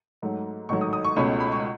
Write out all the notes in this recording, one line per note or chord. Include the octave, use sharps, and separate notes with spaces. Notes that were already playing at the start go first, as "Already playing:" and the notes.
G#2 F#3 A3 D#4
A1 G#2 D#3 F#3 A3 C#6
D#6
D#6
C#6
C#2 B2 A3 C#4 B5
B5
C#6